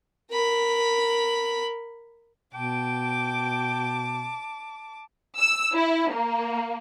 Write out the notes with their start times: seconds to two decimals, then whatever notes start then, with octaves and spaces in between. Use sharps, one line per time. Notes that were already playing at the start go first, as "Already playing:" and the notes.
0.31 A#4 B5
2.54 B2 G5 A5 D6
5.39 E6
5.75 E4
6.12 A#3